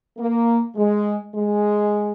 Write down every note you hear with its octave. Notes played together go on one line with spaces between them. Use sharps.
A#3
G#3
G#3